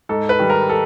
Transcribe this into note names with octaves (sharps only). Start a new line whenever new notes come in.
G#2 A4
B4
D#3 G3
A#4
A4